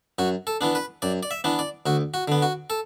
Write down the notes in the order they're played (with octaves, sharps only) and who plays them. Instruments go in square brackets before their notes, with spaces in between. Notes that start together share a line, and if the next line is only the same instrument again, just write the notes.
[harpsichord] F#2 F#4
A4
E3 B3 D4
B4
F#2 D5
D5
E5
E3 B3 D4
D5
D2 F#4
F#4
D3 B3
F#4
A4